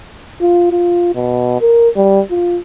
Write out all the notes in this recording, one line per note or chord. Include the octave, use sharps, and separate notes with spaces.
F4
F4
B2
A#4
G3
F4